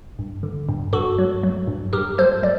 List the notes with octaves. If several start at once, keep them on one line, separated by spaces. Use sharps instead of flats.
G2
D3
G2
G2 F#4 A4
F#3
F#3
G2
G2 G4 A#4
F#3 A4 C5
F#3 D5